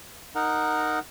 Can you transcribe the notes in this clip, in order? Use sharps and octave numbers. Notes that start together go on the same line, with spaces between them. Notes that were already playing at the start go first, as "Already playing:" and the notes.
D#4 A#4 F#5